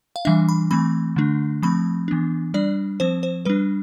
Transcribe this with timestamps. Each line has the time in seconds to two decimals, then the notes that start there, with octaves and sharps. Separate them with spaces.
0.16 F5
0.25 E3 G3 D4 E5
0.49 B5
0.71 E3 A3 C4 B5
1.16 D3 A3 D4
1.63 F3 A3 C4 B5
2.08 E3 B3 D4
2.54 G3 D4 D5
3.00 F3 C4 C5
3.23 C5
3.45 G3 D4 B4